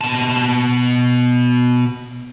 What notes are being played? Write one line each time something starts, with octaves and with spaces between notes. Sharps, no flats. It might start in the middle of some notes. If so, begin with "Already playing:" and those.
B2 A5